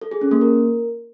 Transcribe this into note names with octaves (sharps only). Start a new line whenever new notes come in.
A4
G#4
C#4
A#3
A#4